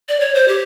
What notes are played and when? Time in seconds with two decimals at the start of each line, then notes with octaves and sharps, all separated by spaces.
0.09 D5
0.20 C#5
0.34 C5
0.48 G4